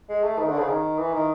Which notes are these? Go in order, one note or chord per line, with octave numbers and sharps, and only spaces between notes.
G#3
A3
D#3
D3
C#3
D#3
E3
D#3